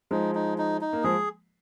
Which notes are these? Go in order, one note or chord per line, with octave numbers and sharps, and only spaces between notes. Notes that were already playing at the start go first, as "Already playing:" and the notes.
F3 G#3 D#4
D#4
D#4
D#4
A#3
F3 G#3 G#4